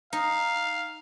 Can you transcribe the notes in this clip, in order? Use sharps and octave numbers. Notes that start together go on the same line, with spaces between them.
D#4 F5